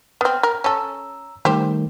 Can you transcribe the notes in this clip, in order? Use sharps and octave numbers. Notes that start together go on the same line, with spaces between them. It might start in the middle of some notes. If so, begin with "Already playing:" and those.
B3 C4 F6
A#4
C#4 A4 A#5 E6
D#3 G3 A3 G4 C5